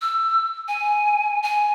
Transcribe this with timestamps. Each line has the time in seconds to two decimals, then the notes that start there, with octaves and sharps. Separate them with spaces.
0.02 E6
0.68 G#5
1.43 G#5